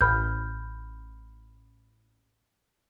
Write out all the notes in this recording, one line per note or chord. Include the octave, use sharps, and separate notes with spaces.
A1 B5 F6 G6